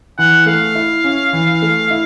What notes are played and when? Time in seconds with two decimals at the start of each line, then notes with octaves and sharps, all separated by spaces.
0.18 E3 F#5
0.46 A3 F5
0.75 E4
1.04 C#4
1.33 E3
1.62 A3
1.91 E4